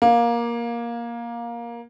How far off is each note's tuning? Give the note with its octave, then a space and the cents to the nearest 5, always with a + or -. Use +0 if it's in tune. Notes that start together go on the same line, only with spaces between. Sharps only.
A#3 +15